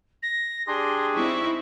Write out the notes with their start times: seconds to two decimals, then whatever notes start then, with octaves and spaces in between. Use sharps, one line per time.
0.22 A#6
0.67 D4 G4 G#4 C6
1.15 C4 D#4 E4 C#6